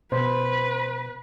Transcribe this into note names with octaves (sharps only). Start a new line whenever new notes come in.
B2 B4 C5